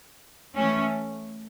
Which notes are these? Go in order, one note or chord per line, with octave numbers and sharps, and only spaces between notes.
E3 A3 C#4